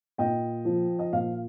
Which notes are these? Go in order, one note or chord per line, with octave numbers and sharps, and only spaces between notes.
A#2 D#5 G5
F3
D#5
A#2 F5